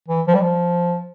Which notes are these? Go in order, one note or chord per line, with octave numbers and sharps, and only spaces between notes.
E3
F3
G3
F3